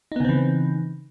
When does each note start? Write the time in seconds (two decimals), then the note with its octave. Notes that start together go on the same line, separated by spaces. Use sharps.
0.12 D#4
0.16 B3
0.20 C#3
0.25 C4
0.29 E3